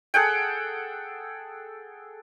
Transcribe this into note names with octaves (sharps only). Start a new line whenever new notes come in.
G#4 A4 F#5 G5